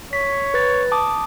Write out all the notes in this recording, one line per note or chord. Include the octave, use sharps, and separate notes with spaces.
C#5 B6
B4 A6
A5 D6 D#6